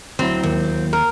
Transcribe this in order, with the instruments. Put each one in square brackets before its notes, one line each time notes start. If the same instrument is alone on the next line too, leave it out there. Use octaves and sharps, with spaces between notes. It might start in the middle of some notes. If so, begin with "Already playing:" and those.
[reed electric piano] D2 F#3 E4 [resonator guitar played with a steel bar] C4 [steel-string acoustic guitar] A#5
[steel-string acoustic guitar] D#2
[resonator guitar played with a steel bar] A#4